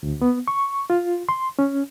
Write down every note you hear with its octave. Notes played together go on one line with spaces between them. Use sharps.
D2
B3
C#6
F4
C6
C#4